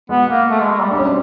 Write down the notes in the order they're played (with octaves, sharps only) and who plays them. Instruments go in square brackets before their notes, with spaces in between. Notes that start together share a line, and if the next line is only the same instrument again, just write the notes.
[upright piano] G#3 [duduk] B3
[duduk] A#3
A3
G#3
G#3
G3
[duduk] G3 [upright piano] D4
[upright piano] C#4
C4